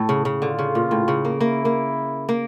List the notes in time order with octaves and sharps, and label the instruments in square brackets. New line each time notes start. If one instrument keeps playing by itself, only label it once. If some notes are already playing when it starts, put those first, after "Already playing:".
Already playing: [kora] A2 [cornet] A4
[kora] C#3
C#3
[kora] D3 [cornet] F4
[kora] C#3
A#2
A2
C#3
A#3
[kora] A#3 [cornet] E4
[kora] A#3
A#3